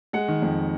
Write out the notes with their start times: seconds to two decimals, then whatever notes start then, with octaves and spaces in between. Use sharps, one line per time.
0.13 G#3 F#5
0.28 D#3
0.42 F2